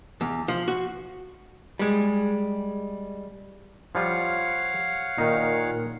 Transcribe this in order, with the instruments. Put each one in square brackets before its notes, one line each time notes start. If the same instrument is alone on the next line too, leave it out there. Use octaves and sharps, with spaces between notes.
[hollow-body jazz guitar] E2
F3
F#4
G3 G#3
[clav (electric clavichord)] F3 G3 F4 [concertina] C#5 F5 F#5
[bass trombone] A#2 [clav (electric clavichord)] D#3 D#4